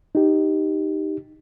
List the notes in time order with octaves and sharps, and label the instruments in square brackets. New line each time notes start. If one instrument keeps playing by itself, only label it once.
[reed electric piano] D#4 G4